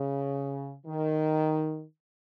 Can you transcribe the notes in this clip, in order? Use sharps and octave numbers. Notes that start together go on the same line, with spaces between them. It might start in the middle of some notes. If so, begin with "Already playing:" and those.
Already playing: C#3
D#3